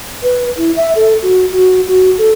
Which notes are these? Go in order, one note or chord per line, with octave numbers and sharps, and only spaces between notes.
B4
E4
E5
A4
F#4
F#4
F#4
A4